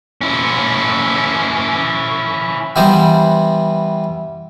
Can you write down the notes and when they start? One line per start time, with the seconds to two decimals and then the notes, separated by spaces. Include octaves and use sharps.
0.21 C#4 E4
2.76 E3 G3 B3 C5 A#5